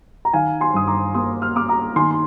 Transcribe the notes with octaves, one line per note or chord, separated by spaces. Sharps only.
A#5
D#3 F5 G#5
G#5 C6
G2 D#6
A#5 D6
A#3 C6 D#6
F6
A#3 D6 F6
A#5 D6
D#3 G#5 C6
C6